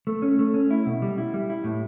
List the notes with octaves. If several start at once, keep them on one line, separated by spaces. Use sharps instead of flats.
A3
C#4
A3
C#4
E4
B2
G3
E4
G3
E4
A2